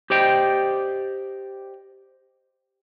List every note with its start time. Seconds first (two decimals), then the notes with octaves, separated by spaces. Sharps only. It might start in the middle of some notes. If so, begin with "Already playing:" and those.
0.10 G4 C5 D5 D#5 G5